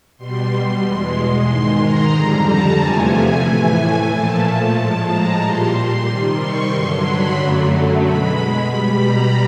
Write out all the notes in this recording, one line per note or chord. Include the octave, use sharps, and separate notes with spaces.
B2 G3 C6
E2 B2 G#3
G#2 D#3 G#3 C6
A#5
F2 D3 G3 A#5
A5
E2 C3 F3 A3 G#5
G#5
A2 E3 A3 G#5
A#2 F3 A3 A5
A5
A2 F3 G#3
A#5
A#2 G3 C6
C6
C3 D#3 G3
C#6
G2 D3 F#3 C6
B5
F#2 D3 F#3 A3
B2 G#3 B5
B2 G3
A#5